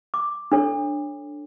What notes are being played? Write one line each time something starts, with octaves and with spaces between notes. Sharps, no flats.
D6
D4 A4 C#5